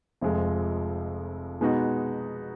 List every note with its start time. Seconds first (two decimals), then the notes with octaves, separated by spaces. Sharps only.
0.21 F1 F2 F3 G#3
1.61 B2 G#3 B3 D#4 F#4